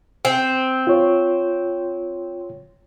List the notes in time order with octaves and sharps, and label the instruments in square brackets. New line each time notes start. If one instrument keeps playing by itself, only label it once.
[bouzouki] C4
[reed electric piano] F4 C#5